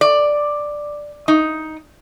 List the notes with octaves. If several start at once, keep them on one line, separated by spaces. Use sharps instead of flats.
D5
D#4